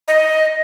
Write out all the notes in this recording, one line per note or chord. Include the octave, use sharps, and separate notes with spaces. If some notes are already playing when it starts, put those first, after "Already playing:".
D#5